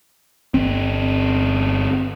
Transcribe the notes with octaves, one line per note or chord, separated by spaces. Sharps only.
G1 C4